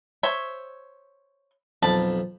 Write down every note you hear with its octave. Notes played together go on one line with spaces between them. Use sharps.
C5 C#5 E5
B1 F2 A5 B5